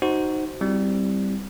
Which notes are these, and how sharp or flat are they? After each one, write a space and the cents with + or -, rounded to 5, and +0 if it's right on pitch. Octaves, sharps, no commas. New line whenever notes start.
D#4 -5 F#4 +15 C5 +0
G3 +0 C4 +0 E4 +0